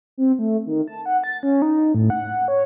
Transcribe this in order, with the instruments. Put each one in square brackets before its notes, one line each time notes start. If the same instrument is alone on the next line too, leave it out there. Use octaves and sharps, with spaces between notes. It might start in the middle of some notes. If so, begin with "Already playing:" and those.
[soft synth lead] C4
A3
D#3
A5
F#5
A6
C#4
D#4
A2
F#5
C#5